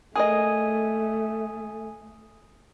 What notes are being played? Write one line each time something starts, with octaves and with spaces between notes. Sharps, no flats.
A3 G#4 A#4 D#5 G#5 D#6